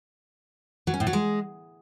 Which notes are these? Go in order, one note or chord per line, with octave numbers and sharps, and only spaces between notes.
F#3
C#4
A2
F#3
G#3